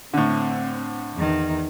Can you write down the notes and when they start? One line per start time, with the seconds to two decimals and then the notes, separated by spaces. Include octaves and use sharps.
0.13 A2 D3 C4
1.15 E2 D#3